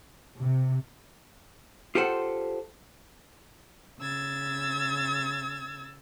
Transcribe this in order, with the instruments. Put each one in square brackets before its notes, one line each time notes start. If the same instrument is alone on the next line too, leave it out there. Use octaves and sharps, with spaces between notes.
[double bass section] C3
[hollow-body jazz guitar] F4 G4 A4 C5 F#5
[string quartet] C#3 E6 G#6 A6